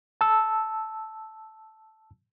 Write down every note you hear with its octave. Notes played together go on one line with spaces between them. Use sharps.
A5 E6